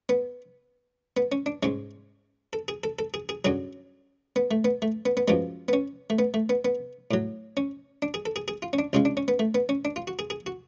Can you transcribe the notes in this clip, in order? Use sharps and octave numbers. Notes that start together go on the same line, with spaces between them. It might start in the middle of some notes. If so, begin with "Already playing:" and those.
B3
B3
C#4
D4
G#2 G#3 C#4
A4
G#4
A4
A4
G#4
G#4
F#2 D3 F#3 G#4
B3
A3
B3
A3
B3
B3
F#2 F3 G#3 B3
B3
C#4
A3
B3
A3
B3
B3
A2 F#3
C#4
D4
G#4
A4
G#4
G#4
F4
C#4
D4
C#2 C#3 G#3 F4
D4
C#4
B3
A3
B3
C#4
D4
F4
F#4
G#4
G#4
F#4